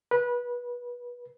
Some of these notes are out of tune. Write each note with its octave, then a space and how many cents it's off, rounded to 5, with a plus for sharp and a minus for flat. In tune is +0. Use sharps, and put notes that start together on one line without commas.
B4 -25